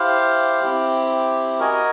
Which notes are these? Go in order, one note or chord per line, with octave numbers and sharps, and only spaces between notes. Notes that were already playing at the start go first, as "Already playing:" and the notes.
Already playing: E4 G4 C5 F5
C4 E4 G4
F#4 A#4 D#5 G#5